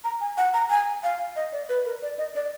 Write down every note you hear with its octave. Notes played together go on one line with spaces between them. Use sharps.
A#5
G#5
F#5
A#5
G#5
F5
D#5
D5
B4
A#4
D5
D#5
D5